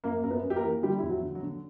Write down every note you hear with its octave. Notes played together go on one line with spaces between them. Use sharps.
F#2 A#3 A#4
F#2 A#4
B3 B4
F#2
G4
A#3 A#4
E3
D3 G3 G4
E2 E4
F#3 F#4
D3
F#3 F#4
D3